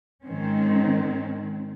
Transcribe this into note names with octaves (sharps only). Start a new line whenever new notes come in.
G#2 D#3 C4 C#4